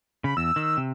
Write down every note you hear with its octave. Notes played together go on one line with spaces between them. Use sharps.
C#3 B5
E2 E6
D#3
C3